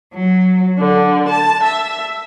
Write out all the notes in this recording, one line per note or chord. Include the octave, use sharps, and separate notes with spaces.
F#3
D3
A5
E5